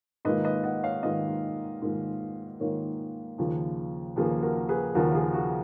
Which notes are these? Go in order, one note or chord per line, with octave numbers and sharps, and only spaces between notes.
G#2 D#3 A#3 F4 B4 D#5
B4 D#5
D#5 F#5
C#5 F5
G#2 D#3 A#3 F4 B4 D#5
G#2 D#3 A#3 F4
G#2 D#3 A#3 F4 A#4 C#5
D#2 C#3 F3 A#3
D#2 C#3 F3 A#3 G#4 B4
F#4 A#4
G#4 B4
D#2 C#3 F3 A#3 F#4 A#4
G#4
F#4